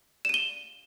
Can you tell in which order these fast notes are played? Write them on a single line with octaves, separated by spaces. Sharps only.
E7 D#7 G7